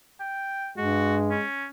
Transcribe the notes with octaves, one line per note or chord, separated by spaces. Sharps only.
G5
G2 G#3 F#4
C#4